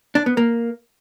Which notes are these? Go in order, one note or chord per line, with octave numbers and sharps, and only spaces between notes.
D4
B3
A#3